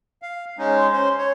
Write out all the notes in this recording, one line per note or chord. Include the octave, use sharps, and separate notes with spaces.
F5
G#3 C#4 D#4
C6
C#4 C5
C#5